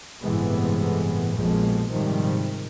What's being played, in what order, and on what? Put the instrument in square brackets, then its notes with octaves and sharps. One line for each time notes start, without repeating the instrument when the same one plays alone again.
[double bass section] G1 A2 C3 E3 G#3 B3
A#1 F2 B2 F3 G#3 A#3
G#2 C3 D#3 F3 G3